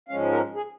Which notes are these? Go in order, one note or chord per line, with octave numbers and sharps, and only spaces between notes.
G#2 F3 G#3 C#4 F5
A#4
G#4